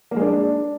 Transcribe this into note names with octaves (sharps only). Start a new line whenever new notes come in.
A#3
G#3
D4